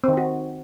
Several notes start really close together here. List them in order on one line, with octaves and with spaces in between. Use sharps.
C4 D#3 D#4 F#4